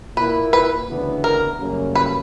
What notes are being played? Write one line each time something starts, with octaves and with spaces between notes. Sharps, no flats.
A#2 A#3 E4 B4
B4
D2 C#3 E3 B3 D4
A#4
F#2 C#3 G3 A#3 C#4
B4